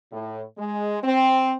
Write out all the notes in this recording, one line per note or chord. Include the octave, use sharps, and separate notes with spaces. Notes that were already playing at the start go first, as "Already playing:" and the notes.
A2
G#3
C4